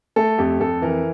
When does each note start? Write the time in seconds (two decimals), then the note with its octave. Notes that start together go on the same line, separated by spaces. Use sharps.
0.16 A3 A4
0.38 F2 G4
0.60 F2 A4
0.82 E3 A#4